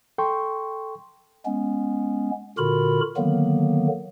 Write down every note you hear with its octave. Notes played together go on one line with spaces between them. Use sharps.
A4 G5 C6 C#6
G#3 B3 C#4
A#2 D3 F4 F#4 A#4 B5
D3 D#3 F#3 A#3 B3